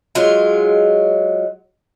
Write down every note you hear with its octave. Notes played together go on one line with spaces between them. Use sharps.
F#3 G#3 F4